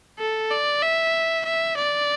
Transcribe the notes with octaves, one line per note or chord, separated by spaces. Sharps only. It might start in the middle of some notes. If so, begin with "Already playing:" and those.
A4
D5
E5
E5
D5